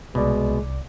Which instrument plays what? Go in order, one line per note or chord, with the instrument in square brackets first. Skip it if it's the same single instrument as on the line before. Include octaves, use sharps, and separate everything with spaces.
[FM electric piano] C2 D5 [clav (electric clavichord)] B2 [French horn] G#3